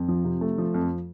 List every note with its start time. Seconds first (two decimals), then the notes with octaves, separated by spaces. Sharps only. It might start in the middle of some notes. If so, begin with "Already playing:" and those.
Already playing: F2
0.08 F3
0.25 C3
0.41 A3
0.58 F3
0.74 F2